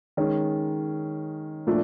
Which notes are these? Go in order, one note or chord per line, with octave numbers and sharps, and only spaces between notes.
D#3 G#3 C#4
A#2 F3 A3 D4